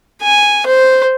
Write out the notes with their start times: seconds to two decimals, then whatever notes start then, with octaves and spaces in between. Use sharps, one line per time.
0.22 G#5
0.66 C5